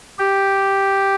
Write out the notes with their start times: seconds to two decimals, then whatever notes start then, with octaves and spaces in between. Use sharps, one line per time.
0.19 G4